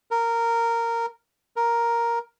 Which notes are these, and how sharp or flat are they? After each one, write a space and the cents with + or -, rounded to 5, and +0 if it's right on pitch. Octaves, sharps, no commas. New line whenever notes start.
A#4 -10
A#4 +5